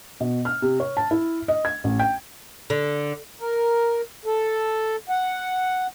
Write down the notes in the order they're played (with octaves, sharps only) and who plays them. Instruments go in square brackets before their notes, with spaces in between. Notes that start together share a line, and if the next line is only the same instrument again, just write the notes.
[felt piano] B2
F6
C3
C#5
A5
E4
D#5
G#6
A1
G5
[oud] D3
[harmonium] A#4
A4
F#5